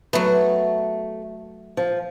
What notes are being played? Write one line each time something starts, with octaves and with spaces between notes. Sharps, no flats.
F#3 A3 B3
F3